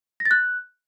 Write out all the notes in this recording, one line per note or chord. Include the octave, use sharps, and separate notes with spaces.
A#6
A6
F#6